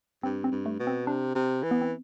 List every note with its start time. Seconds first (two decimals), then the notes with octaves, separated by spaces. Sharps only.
0.23 G2 C4
0.44 C4
0.52 G2
0.66 A3
0.80 B2
0.87 C4
1.07 C3 D4
1.35 C3
1.63 E3
1.71 B3
1.81 C4